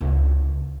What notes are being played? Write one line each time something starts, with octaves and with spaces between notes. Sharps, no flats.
C#2